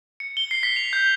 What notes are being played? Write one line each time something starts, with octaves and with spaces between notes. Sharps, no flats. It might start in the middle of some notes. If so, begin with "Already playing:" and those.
C#7
G7
C7
B6
F7
G6